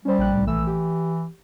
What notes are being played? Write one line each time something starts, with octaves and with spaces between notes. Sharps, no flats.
G3 C#4 C5
A#1 G5 F#6
C2 A2
A#1 E3 A3 E6
G4